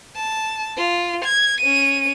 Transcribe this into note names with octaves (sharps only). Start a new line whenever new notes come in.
A5
F4
G#6
C#4 D#7